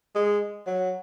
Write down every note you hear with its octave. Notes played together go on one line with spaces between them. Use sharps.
G#3
F#3